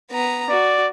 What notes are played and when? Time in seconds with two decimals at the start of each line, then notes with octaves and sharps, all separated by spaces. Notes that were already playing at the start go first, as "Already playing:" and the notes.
0.11 B3 A#5
0.50 F#4 D5